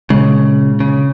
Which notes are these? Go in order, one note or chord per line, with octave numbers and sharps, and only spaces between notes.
A#2 C#3 G#3
C#3